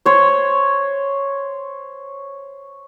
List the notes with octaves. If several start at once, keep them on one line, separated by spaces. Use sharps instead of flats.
C5 C#5